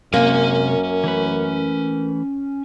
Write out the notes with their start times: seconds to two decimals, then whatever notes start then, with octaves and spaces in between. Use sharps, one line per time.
0.14 F#2 C3 G#3 A#3 C#4 G#5
1.04 E3 A3 B4